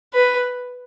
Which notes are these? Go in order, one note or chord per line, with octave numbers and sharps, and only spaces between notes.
B4